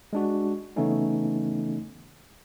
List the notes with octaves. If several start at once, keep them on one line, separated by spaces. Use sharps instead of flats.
G#3 D4 F#4
C#3 E3 A3 B3 C#4 D#4